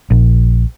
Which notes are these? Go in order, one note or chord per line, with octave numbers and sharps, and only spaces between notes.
A#1